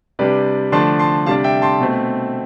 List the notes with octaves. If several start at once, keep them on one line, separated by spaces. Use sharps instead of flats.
C3 G3 D4 B4 D5
D3 F3 A3 D4 A5 C6
A5 C6
C3 G3 D4 F5 A5
E5 G5
A5 C6
B2 A3 C4